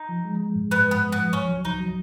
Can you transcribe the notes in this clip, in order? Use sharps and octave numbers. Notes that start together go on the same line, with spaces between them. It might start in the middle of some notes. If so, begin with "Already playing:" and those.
Already playing: D#4
F3
G#3
G#3
G#2
G#2 B3
G#2 B3
G#2
B3
F3
C#2 C#4
F#3
C#2 D#4
F#3